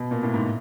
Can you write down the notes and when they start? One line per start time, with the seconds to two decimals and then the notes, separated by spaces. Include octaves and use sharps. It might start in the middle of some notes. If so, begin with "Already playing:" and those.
Already playing: B2
0.11 A#2
0.23 A2
0.34 G#2